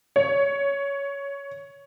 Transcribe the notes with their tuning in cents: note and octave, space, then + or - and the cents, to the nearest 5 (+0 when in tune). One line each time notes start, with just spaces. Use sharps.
C#5 +15